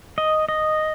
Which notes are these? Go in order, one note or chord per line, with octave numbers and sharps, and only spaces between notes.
D#5
D#5